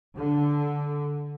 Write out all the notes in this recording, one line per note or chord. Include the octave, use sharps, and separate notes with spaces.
D3